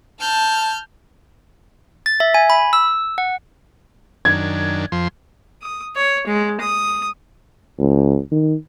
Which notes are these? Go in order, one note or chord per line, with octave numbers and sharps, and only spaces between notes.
A5 F6 G6
A6
E5
G#5
B5
E6
F#5
F#2 D#3 D4 G#6
F2 F3 C6
D#6
C#5
G#3
D#6
C#2
D#3